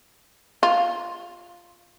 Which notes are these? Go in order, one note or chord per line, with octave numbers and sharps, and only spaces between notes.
F4